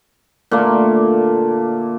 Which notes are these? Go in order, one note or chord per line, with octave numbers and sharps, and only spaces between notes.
A#2 D3 A3 A#3